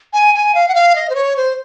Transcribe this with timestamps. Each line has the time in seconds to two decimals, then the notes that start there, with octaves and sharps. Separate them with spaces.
0.13 G#5
0.34 G#5
0.55 F5
0.68 F#5
0.74 F5
0.95 D#5
1.09 C5
1.15 C#5
1.36 C5